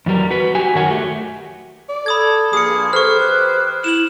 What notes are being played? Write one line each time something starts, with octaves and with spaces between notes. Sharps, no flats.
E2 F#3 G3 A#4
F#4 B4
F#4 G4 G#5
F#2 D#3 A#4 C#5 F#5 G#5
A3 F#4 G4
D5
A4 B5 D#6 G#6
G2 F3 A#3 G#4 D#6 C#7
E3 G4 A4 B4 C5 C#6 F6
F#6
E4 E7 F#7